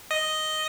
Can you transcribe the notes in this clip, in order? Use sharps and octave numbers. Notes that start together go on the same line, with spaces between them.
D#5